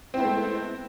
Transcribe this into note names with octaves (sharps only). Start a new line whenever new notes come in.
G#3 A3 B3 C4 E4